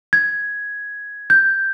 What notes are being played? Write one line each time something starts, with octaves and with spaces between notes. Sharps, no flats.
G#6
G6